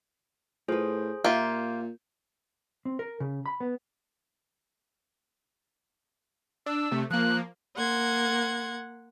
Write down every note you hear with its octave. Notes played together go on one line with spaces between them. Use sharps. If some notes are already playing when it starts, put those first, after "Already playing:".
A2 F4 G#4 B4 C5
A#2 A#3 F4 G4 E5 F#5 G6
C4
A#4
C#3
B5
B3
D4 E6
C3 A3
F3 A#3 F#6
A#3 F#5 C6 G#6